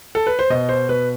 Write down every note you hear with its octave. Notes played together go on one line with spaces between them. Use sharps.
A4
B4
C5
B2 D#5
C5
B2 B4